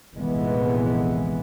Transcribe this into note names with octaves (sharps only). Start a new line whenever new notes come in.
F1 A#1 E3 G#3 B3